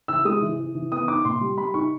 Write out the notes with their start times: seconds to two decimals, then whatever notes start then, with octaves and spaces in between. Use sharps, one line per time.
0.08 E3 E6
0.25 G#3 D#6
0.42 E3
0.59 E3
0.75 E3
0.92 B3 D#6
1.08 D#4 D6
1.25 A#2 C6
1.41 G3
1.58 G3 B5
1.74 D#4 C#6